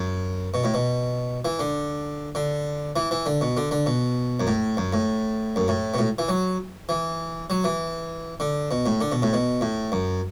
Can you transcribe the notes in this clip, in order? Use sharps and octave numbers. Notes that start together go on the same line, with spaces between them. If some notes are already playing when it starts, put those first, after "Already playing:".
Already playing: F#2
B2
A2
B2
E3
D3
D3
E3
E3
D3
B2
D3
D3
B2
F#2
A2
F#2
A2
F#2
A2
B2
A2
E3
F#3
E3
F#3
E3
D3
B2
A2
D3
B2
A2
B2
A2
F#2